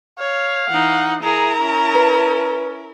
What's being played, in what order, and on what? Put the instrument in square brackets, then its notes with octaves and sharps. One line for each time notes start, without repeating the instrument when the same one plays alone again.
[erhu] C#5 [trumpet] F5
[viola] E3 D#4 [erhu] F#5
[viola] E4 A#4 [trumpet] G#4 [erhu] A#5
[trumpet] C#4
[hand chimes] B4